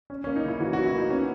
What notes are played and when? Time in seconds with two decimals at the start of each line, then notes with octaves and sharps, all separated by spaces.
0.10 C#4
0.24 A#3 C#4
0.36 D#4
0.44 C#3 E4
0.60 E3 F#4
0.73 C#4 F#4
0.86 E4
0.95 A#3 D#4
1.10 B3 C#4